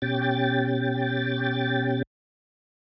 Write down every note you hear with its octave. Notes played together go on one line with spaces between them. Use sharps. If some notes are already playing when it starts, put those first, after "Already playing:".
B2 C#4 G4 G5 A6